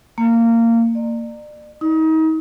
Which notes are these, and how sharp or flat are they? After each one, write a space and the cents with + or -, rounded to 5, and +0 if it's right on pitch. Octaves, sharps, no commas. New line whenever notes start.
A#3 -20
D5 +35
D#4 +35